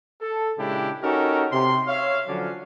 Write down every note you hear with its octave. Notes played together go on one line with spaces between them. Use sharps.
A4
A#2 C#3 G#3 D4 E4 G4
C#4 D#4 F#4 G4 A4 A#4
C3 C6
C#5 E5 F5
D3 F3 F#3 C#4 D4